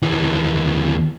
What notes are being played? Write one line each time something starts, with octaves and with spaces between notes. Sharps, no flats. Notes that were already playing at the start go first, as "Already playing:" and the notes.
D#2 E3